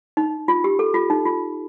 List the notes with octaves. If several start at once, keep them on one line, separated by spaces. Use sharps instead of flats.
D#4
F4
G4
A4
F4
D#4
F4